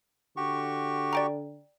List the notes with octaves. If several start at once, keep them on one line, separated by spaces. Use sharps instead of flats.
D3 F#4 G4 C#6
D5 G5 A#5